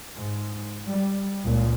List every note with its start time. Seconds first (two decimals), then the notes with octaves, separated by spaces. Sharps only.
0.16 G#2
0.87 G3
1.43 C#2 A#2